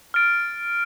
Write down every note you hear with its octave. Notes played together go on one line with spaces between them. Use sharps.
F6 A6 D7